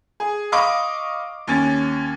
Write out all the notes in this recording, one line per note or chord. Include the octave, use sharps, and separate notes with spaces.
G#4
D#5 F5 B5 C#6 D6
D#2 C#4 A6